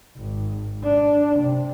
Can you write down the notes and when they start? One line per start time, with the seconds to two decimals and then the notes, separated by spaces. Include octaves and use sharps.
0.17 G#1
0.84 D4
1.40 C3